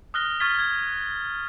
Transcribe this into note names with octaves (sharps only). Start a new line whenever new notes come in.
D#6 F6 F#6 A#6 G7
C#6 F6 G#6 A6 B6 G7
G#6